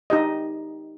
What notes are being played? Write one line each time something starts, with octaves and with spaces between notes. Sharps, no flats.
D#4 G4 D#5